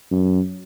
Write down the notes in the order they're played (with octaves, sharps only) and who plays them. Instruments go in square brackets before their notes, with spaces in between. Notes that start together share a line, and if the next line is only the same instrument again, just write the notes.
[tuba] F#2